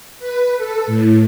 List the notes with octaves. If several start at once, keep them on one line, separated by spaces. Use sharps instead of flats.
B4
A4
A2